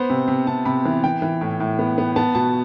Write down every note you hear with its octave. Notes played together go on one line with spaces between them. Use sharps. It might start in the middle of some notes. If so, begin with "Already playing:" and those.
Already playing: B3 C5
C3
C3
C3 A5
C3 B5
E3
E3 G5
E3
A2
A2
B3
B3
B3 A5
B2 A5